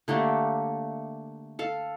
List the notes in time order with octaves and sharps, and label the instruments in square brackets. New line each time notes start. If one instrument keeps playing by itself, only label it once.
[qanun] D3 A3 A#3 G4
A4 F5